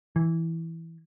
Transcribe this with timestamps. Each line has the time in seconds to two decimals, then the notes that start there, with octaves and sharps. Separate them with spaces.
0.16 E3